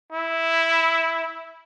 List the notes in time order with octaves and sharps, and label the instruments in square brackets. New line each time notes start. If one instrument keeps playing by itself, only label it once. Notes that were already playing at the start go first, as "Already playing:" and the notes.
[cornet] E4